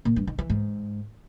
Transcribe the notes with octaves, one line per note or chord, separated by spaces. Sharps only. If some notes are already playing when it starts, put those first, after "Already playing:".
A#2
G2
D#3
E3
G#2